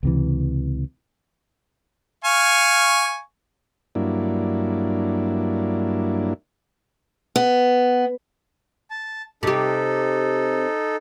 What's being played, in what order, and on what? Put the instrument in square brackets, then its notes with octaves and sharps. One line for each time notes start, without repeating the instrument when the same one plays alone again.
[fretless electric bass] C#2 C3 E3
[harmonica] F5 G#5 C#6
[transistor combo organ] G2 F#3 A#3 D4 E4
[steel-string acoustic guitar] B3
[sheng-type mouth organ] A5
[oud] C3 G4 [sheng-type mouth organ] D#4 A4